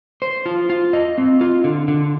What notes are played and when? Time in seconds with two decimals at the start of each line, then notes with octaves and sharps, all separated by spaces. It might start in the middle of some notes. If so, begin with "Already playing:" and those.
0.22 C5
0.46 F4
0.70 F4
0.93 D#5
1.18 C4
1.41 F4
1.64 D3
1.88 D3